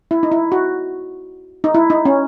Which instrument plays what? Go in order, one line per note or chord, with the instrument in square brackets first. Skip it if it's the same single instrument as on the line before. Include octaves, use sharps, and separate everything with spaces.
[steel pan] E4
D#4
E4
F#4
D#4
E4
D#4
C#4